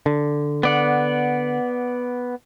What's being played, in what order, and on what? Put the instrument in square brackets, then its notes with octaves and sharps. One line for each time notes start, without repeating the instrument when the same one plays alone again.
[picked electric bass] D3
[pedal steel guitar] B3 D5 F#5